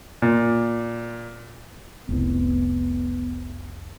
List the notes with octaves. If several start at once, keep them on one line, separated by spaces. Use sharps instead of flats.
A#2
F1 C2 B3